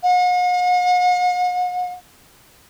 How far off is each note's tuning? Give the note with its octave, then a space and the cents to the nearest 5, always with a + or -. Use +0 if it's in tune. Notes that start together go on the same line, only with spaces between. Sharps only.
F#5 -45